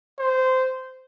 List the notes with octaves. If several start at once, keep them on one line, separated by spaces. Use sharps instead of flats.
C5